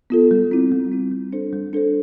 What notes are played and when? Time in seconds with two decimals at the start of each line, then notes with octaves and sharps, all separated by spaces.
0.10 B3 F4 A4
0.31 G3
0.51 C4 E4
0.72 G3
0.92 C4 E4
1.12 G3
1.33 D4 A4 C5
1.53 G3
1.73 D4 A4 C5